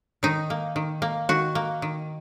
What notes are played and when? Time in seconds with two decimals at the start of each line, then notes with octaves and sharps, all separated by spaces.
0.23 D#3 D#4
0.50 A#3
0.76 D#3
1.02 A#3
1.29 D#3 F#4
1.55 A#3
1.82 D#3